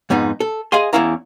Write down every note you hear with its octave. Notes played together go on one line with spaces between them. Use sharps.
F2 G#2 B3 D#4
A4
G#4 D#5 F5 G#5 C6
E2 C4 C#4 E4 F5 A#5